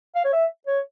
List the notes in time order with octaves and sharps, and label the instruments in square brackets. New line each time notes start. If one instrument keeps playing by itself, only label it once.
[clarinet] F5
C#5
E5
C#5